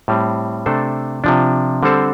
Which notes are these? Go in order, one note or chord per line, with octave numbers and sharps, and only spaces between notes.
A2 G3 C4
C3 A3 D4 A4 C5
C3 F3 D4
D3 G3 C4 A4 C5